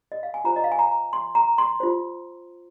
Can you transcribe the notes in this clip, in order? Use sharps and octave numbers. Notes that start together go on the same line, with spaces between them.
D#5
F5
G#5
F4 C5 A#5
D#5
F5
G#5
A#5
C6
A#5
C6
F4 C5